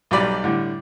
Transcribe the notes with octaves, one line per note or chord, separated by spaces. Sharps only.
B1 F#3 G3 D5 B5
A2 D3 G3